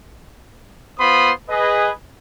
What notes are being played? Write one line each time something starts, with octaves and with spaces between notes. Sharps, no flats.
B3 F4 C5 B5 C6 D#6
G#4 B4 D#5